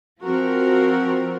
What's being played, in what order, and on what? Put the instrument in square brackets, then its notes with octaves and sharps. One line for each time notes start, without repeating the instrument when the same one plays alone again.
[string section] F3 C4 F#4 A#4